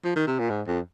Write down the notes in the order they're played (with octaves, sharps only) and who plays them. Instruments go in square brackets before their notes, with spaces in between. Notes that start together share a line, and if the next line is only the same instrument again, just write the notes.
[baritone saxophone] F3
D#3
C3
A#2
G#2
F2